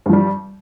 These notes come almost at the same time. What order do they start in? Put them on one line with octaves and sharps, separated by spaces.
G2 F3 G3